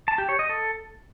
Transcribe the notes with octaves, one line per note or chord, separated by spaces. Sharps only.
A5
G4
C#5
D#5
A4